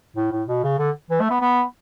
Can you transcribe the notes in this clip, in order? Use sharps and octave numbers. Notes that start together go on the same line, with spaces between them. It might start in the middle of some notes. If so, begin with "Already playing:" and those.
A2
A2
B2
C#3
D3
E3
A3
B3
B3